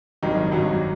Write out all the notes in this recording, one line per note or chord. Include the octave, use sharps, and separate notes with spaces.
G#1 G2 D#3 F#3
G#1 G2 D#3 F#3